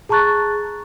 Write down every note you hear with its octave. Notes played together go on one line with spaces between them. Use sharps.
G#4 A5 A#5 C#6 F#6 A6